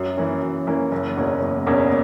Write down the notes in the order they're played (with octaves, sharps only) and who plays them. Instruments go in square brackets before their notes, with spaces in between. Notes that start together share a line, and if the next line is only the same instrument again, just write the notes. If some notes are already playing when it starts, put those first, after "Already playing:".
Already playing: [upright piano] F#2
E3 A#3 C#4
F#2
E3 A#3 C#4
F#1
E2 B2 A#3 C#4
F#1
E2 B2 A#3 C#4